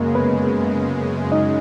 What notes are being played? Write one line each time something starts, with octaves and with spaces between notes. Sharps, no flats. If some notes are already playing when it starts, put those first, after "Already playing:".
Already playing: F#2 C#3 G#3 A#3 A#4
B3 B4
D#4 D#5